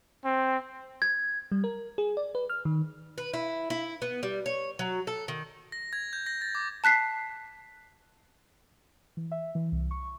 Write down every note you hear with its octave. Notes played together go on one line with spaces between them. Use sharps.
C4
G#6
G3
A#4
G#4
D5
B4
F6
D#3
B4
E4
E4
B3
G3
C#5
F#3
A4
D#3
A#6
G#6
G6
A#6
A6
D6
A5 F#6 B6 C7
E3
E5
E3
C2
C#6